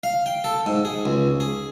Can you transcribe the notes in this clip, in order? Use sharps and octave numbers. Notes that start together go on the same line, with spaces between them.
F5
G5
A4
G#2
G#4
C#2
G#4